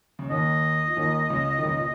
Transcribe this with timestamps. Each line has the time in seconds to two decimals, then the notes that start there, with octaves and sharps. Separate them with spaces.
0.19 C#3
0.30 D#2 D#3 D#5
0.87 F3
0.96 D#2 D#3
1.30 C#2 C#3
1.58 D#3
1.64 C#2 C#3
1.77 A#2